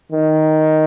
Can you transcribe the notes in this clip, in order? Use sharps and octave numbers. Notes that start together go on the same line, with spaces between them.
D#3